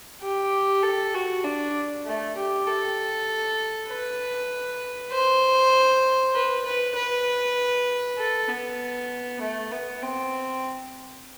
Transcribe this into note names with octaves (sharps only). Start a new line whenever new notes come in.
G4
A4
F#4
D4
A3
G4
A4
B4
C5
B4
B4
B4
A4
B3
A3
B3
C4